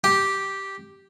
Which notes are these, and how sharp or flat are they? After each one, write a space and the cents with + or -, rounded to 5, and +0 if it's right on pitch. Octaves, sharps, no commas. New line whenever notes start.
G4 -5 G5 +0